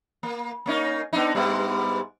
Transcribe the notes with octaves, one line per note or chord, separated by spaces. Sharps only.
A#3
A#3 C#4 D#4
B3 D4 D#4
G#2 G3 B3